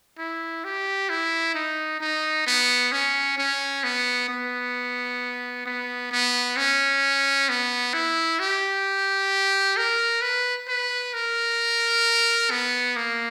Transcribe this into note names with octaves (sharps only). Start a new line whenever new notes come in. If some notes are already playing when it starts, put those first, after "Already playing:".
E4
G4
E4
D#4
D#4
B3
C#4
C#4
B3
B3
B3
B3
C#4
B3
E4
G4
A#4
B4
B4
A#4
B3
A#3